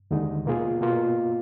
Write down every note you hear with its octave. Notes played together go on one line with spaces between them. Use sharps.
D#2 D3 G#3 D#4
B2 A#3 F4 G#4
B2 A#3 F4